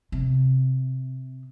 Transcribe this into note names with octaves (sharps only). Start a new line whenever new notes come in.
C3